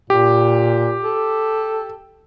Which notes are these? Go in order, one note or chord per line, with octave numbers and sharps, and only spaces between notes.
A#2 G4
A4